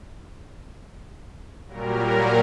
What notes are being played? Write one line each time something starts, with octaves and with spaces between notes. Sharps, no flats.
A#2 F#3 G3 A#4